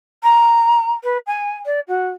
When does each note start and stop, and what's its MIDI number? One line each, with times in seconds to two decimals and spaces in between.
0.23 0.91 82
1.03 1.18 71
1.27 1.55 80
1.65 1.80 74
1.88 2.07 66